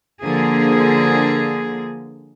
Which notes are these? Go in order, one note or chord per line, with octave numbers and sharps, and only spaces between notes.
D3 F3 A#3 G#4